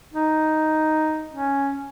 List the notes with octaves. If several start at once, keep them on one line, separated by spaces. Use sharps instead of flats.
D#4
C#4